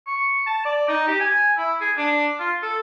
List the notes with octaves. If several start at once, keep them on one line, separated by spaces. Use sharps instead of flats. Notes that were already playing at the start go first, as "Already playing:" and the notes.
C#6
A5
D5
D#4
G4
G#5
E4
G#4
D4
F4
A4